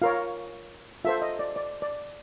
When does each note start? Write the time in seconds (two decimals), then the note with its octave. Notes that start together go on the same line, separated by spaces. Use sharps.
0.02 F4 A#4 C#5 F5
1.05 F4 A4 C5 E5
1.22 D#5
1.39 D5
1.56 D5
1.82 D5